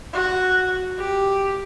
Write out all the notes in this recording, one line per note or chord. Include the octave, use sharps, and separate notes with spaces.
F#4
G4